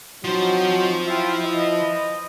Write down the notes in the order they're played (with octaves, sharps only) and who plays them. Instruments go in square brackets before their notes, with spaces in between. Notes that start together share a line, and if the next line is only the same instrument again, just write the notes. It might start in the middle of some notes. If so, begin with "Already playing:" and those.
[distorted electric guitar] F3 C5 [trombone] F#3 [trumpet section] C4 D#4
[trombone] E4 [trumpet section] F4 E5 G5
[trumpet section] B4 D#5